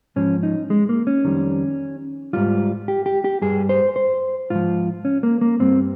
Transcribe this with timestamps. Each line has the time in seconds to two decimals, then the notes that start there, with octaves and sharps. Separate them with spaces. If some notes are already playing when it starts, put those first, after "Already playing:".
0.16 G#2 F3 C#4
0.43 D#4
0.70 G#3
0.89 A#3
1.07 C#4
1.25 F2 D#3 G3
2.33 G#2 G3 F4
2.88 G4
3.06 G4
3.24 G4
3.42 G2 G3 G#4
3.69 C5
3.96 C5
4.50 G#2 F3 F4
5.05 C#4
5.23 A#3
5.41 A#3
5.59 G2 G3 C4